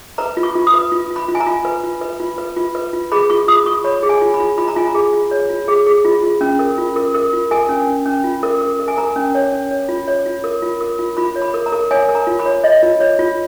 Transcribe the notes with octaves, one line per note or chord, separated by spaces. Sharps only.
B4 A#5
F4
C#6
F4
D#6
B4
F4
F4
B5
F4
G#5
A#5
F4
B4
F4
B4
F4
B4
F4
B4
F4
G#4 B5
F4 C#6
F4 D#6
F4 C#6
C#5 B5
G#4
G#5
F4
B5
F4
F4 B5
A#5
F4 G#5
A#5
G#4
F4
C#5
F4
G#4
G#4
F4
F4
C#4
A#4
F4
A#4
A#4
F4
A#4 G#5
C#4
C#4
C#4
F4
A#4
A#4
A#4
G#5
A#4 A#5
C#4
C#5
C#4
C#5
F4
C#5
F4
A#4
F4
A#4
F4
F4 B5
C#5
B5
A#4
A#5
A#4
C#5 G#5
A#4
A#5
F4
B5
C#5
C#5 D#5
F4
C#5
F4